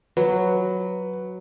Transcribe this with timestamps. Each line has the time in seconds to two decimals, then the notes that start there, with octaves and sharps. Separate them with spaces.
0.17 F#3 B4